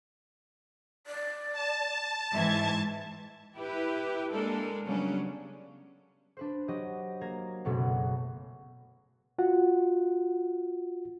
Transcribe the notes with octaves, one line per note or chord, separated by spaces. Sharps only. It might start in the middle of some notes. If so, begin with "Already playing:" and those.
D5
A5
G#2 E3 E5 G#6
E4 G4 B4
G#3 A#3 D4 A4 A#4
C#3 F#3 G3 B3 C#4 D4
D4 B4 C5
F#3 G4 D#5
A#3 A#5 G#6
F#1 B2 F#3 A3 B3
F4 F#4 F#5